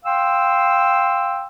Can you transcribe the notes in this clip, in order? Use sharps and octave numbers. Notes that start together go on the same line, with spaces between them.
F5 G5 C6 E6